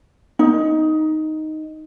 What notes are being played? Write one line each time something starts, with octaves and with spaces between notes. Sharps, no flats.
D#4